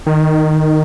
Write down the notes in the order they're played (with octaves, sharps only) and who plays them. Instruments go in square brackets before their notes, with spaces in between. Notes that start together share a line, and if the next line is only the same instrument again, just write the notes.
[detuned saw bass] D#3